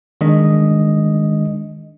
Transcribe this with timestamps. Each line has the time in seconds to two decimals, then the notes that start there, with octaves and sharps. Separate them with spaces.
0.21 D#3 G#3 D4 D#5